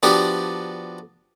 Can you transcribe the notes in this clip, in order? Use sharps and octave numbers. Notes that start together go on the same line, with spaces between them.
F3 B3 D4 F#4 G4 D5